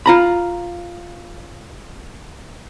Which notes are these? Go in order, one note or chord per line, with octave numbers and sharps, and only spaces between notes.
F4 A#5 B5